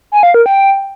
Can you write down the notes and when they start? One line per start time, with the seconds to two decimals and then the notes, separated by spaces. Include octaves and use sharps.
0.12 G#5
0.23 F5
0.34 A#4
0.46 G5